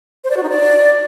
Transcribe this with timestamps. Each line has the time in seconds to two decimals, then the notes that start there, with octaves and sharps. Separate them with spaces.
0.24 C5
0.30 D5
0.37 F#4
0.43 D#4
0.49 D5